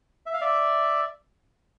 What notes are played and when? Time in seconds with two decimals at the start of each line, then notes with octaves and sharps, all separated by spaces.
0.26 E5
0.33 F5
0.41 D5 E5